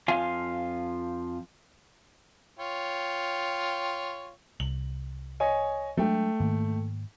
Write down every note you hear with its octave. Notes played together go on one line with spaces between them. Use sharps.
F2 F3 F4 F5 G#5
F4 C#5 G5
C2 F#7
C#5 D#5 G#5
F#3 G#3 A3 D4 G5
G#2 D#3 A#3